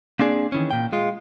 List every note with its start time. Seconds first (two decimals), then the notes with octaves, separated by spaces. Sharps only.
0.19 A#3 C4 D4 G#4 D5
0.52 D#3 E3 C#4
0.71 A#2 G5
0.93 G#3 F4